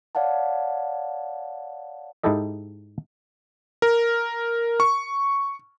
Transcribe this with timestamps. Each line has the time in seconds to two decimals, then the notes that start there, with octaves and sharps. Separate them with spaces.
0.15 C#5 D5 F5 F#5 A5
2.23 G#2 D#4 E4 G4 A4 D#5
3.82 A#4
4.80 C#6